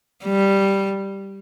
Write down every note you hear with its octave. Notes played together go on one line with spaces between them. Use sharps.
G3